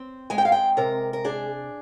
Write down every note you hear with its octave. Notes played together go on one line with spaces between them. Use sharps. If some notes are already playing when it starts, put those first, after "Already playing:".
Already playing: C4
G#3 G#5
G5
F5
G5
C3 A#4
A#4
D4 G#4